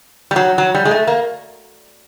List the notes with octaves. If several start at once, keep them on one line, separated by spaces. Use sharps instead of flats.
G3
F#3
F#3
G3
G#3
A3
A#3